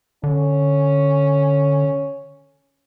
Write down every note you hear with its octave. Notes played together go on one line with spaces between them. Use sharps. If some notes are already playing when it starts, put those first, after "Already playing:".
D3 C#4